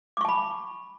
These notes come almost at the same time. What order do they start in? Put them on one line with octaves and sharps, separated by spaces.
D6 C#6 A5 B5